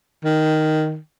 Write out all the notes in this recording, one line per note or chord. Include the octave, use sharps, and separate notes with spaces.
D#3